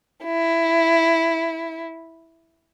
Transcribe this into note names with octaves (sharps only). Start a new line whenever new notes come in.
E4